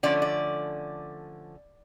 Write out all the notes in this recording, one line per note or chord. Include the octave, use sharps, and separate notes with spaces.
D3 F3 A3 C#4 D5
D5